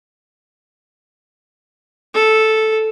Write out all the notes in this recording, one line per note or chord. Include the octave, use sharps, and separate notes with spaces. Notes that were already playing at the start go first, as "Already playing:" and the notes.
A4